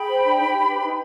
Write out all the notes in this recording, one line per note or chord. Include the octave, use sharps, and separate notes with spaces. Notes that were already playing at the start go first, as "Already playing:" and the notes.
Already playing: G#4 G5 B5
C5
D4
D#4
G4
B4
D#4